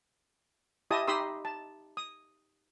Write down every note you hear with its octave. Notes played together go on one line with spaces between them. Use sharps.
E4 G4 D#5 G#5 A5 D#6
D#4 G4 B5 C6 D#6 E6
A5
D#6